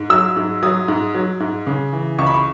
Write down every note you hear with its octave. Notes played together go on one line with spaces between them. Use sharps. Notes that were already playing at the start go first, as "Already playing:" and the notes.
Already playing: G#2
F#3 E6
G#2
F#3 D#6
G#2
F#3
G#2
C#3
E3
C#2 C#6
B5
C#6